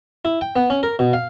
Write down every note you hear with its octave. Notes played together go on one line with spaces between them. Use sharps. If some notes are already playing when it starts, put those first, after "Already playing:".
E4
G5
B3
C#4
A#4
B2
F5